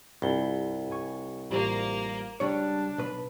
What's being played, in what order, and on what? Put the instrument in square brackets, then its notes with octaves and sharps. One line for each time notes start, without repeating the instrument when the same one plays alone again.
[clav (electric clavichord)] C2 [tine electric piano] G2 [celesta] F4 B5 G7
[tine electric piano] G#5 C#6
[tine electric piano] A1 G3 [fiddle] A#3 [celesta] F4 G4 C5
[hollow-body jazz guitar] C#2 G3 C#5 [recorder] D4
[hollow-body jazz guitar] B1 B4